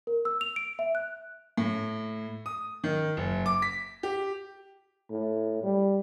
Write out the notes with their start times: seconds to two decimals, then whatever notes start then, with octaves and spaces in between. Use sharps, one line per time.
0.07 A#4
0.25 E6
0.41 F7
0.56 D7
0.79 E5
0.95 F#6
1.57 A2
2.46 D#6
2.84 D#3
3.17 F#1
3.46 D6
3.62 B6
4.03 G4
5.11 A2
5.63 G3